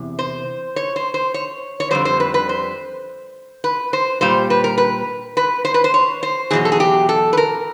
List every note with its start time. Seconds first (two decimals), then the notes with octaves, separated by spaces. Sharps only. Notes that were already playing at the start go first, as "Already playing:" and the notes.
Already playing: E2 C3
0.19 C5
0.76 C#5
0.96 C5
1.14 C5
1.34 C#5
1.80 C#5
1.91 F2 D3 G3 C5
2.05 C5
2.20 B4
2.34 B4
2.49 C5
3.64 B4
3.93 C5
4.21 A#2 G3 C5
4.50 B4
4.64 A#4
4.78 B4
5.37 B4
5.65 C5
5.74 B4
5.84 C5
5.94 C#5
6.23 C5
6.51 E2 B2 F#3 G#4
6.65 A4
6.72 G#4
6.80 G4
7.09 A4
7.33 B4
7.37 A#4